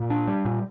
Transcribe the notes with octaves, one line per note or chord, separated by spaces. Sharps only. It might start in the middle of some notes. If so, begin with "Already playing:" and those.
Already playing: A#2
D4
G3
A#2